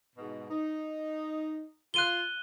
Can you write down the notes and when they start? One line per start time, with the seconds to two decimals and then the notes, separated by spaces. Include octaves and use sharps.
0.16 G#2 B2
0.49 D#4
1.94 F4 F#6 D#7 G7